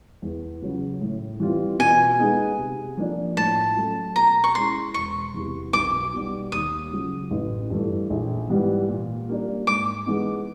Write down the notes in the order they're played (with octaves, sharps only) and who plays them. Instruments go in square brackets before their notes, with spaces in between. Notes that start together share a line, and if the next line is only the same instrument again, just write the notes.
[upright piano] E2
C#3 F#3
A2
E3 G3 C4 F4
[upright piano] B2 [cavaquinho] G#5
[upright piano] G#3 B3 D#4 G#4
C3
F3 A#3 D4
[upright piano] A2 [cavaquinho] A5
[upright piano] F#3 A3 C#4
[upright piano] B2 [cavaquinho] A#5
[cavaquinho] C#6
[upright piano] G#3 C#4 E4 [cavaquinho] C6
[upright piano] E1 [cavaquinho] C#6
[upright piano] E2 C3
[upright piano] B1 [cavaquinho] D6
[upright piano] B2 G3 B3 D#4
[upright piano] D#2 [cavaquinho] D#6
[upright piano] C#3 F#3
A1
G2 E3 A3
A#1
G#2 E3 G3 B3
A#2
G3 A#3 D4
[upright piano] G#2 [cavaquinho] D6
[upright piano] E3 G#3 B3 D#4